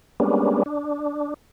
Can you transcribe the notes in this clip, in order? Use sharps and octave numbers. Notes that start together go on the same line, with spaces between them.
G3 G#3 A#3 B3 C#4 D4
D4